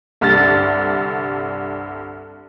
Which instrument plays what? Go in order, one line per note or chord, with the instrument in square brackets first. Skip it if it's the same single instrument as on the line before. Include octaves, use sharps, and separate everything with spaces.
[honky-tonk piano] C2 G2 D3 F6 A6